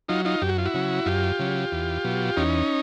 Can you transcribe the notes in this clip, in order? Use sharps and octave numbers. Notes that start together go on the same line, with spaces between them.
F#3 D#4 F4
D#4 F4
F#2 G4
F#4
F4
E4 F#4
C#3 F#3
F#2 F4 G4
C#3 F#3
E2
B2 F#3
E2 C#4 D#4